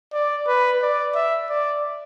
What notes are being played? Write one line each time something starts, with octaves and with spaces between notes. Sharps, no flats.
D5
B4
D5
E5
D5